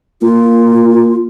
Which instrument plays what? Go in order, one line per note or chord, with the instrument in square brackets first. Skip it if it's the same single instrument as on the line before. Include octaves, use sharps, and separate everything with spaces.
[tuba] A#3 [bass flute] F4